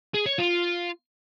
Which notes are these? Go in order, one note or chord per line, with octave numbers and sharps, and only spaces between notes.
G#4
C#5
F4